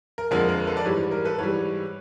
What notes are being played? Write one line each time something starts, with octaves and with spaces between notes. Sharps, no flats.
A#4
F2 D3 F3 G#3 A#4
A#4
A4 B4
D5
G#2 E3 G3 B4 C#5
A#4
A4 B4
G#2 E3 G3 B4 C#5